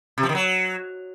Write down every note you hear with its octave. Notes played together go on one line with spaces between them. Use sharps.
C3
F3
D#3
F#3